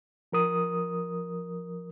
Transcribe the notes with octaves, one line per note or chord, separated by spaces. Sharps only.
F3 A#4 D#6